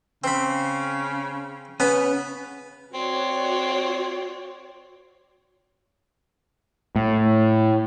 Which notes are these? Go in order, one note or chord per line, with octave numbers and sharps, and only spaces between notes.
C#3 C4 B5
C#3 B3 C#4 F#5 B5
C4 F#4 C#5 D5
A2